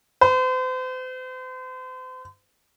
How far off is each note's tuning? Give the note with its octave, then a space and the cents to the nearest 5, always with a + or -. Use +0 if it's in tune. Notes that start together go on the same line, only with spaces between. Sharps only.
C5 -40